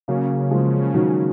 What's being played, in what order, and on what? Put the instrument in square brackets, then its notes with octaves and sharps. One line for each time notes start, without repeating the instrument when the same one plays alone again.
[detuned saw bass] C#3 [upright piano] F#3 A#3
[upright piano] F3 G#3
D#3 F#3